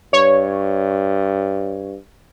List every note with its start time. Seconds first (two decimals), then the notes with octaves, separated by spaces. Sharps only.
0.13 G2 C#5